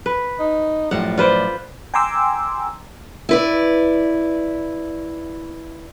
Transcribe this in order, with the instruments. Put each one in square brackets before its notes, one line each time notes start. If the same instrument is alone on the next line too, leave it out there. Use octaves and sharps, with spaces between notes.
[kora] B4
[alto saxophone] D#4
[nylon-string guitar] F#2 A2 F3 [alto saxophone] G3 [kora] F#5
[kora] F4 B4 C5 [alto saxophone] D5
[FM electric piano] G5 G#5 A#5 C6 D6 E6
[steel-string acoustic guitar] E4 B4 D5